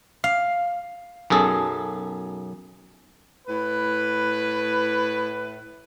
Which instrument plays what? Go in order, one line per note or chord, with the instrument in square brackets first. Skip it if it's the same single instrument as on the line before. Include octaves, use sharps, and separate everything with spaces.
[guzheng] F5
[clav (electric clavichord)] B1 F#2 G#4 A4
[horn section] A2 B4